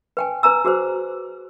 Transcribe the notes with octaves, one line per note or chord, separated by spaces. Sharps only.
B4 G5 G#5
B4 G#5 A#5 E6
F#4 G#4 B4 C5